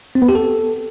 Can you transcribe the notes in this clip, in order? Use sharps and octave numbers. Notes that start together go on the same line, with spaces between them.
C4
B3
G4
A4